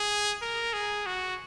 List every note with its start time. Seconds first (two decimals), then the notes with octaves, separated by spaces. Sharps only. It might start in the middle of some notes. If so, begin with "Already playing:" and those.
Already playing: G#4
0.42 A#4
0.73 G#4
1.06 F#4